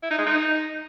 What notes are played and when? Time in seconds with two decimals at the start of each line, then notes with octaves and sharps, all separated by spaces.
0.03 E4
0.10 D#4
0.18 G#3
0.26 D#4